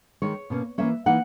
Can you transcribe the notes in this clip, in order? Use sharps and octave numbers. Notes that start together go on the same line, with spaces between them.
D#3 G#3 D#4 C#5
B2 A#3 C#4
E3 A#3 C#4 E5
E3 A#3 D#4 F#5